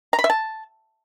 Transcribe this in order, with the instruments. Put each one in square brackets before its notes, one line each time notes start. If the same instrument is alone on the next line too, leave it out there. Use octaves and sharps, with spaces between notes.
[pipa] A#5
B5
E5
A5